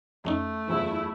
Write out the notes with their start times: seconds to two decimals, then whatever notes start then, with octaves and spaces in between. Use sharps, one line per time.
0.25 F2 A3 C#4 D#4
0.68 F#1 E2 E4 F4